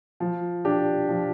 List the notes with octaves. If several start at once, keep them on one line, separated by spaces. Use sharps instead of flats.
F3
D4 G4
F3